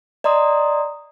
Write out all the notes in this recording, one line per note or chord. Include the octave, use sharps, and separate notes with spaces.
D5 D#5 A#5 C6 D#6